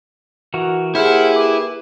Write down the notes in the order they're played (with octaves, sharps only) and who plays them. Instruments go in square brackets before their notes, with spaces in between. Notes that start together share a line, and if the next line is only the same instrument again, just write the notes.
[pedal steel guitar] E3 F#4 A#4
[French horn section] A#3 G4 G#4 [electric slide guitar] E4 [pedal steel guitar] C5 F#5 F6
[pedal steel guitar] B4 D6